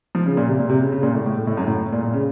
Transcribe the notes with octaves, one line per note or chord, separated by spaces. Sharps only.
F3
C#3
A#2
C3
A#2
C3
C#3
C#3
A#2
A2
A2
A2
A2
F#2
A2
A#2
A#2
C#3